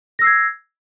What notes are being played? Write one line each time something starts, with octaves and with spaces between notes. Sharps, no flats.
E6 G#6 A#6 C7